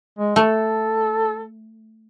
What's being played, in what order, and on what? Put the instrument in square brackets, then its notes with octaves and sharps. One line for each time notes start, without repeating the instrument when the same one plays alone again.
[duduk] G#3
[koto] A3 [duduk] A4